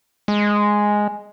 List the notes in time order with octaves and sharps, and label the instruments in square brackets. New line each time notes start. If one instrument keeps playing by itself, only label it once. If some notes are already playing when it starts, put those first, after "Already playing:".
[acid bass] G#3